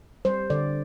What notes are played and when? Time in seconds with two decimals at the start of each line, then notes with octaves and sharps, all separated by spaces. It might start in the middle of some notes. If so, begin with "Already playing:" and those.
0.25 G3 C5
0.50 D3 D5